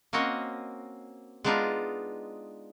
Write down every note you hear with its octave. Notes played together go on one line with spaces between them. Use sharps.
A#3 C4 C#4 F#4 C#5 D#5
G#3 B3 D4 D#4 F4